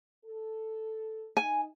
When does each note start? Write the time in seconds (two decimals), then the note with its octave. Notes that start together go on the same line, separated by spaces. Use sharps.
0.25 A4
1.37 D#4 G#5